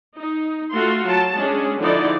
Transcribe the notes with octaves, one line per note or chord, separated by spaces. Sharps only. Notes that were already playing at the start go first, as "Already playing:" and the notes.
D#4
A3 F4 F#4 F5 C6
F#3 A5
G#3 C#4 D4 G#4
D3 F3 D#4 E4 G#4 D5